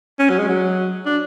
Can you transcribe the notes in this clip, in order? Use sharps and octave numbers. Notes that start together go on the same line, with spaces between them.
C#4
F#3
G#3
F#3
D4